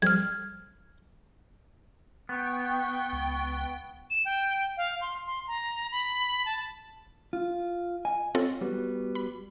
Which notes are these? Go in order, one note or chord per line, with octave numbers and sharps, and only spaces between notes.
F2 G3 C4 F6 G#6
B3 G5 C#6
C#2
E7
G5
F5
C6
C6
A#5
B5
A5
F4
D#5 G#5
C4 F4 A4 C#5 D#5
G3 B3 F#4
B5